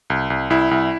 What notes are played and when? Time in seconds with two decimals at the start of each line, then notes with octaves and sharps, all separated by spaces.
0.10 C2
0.30 C2
0.50 C2 E4
0.71 C2